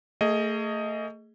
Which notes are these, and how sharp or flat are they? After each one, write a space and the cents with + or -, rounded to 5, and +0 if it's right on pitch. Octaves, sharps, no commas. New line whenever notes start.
A3 +30 G#4 +0 D#5 +10